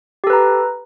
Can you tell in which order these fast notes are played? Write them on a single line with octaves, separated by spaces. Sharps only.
G4 A4 B4 A#5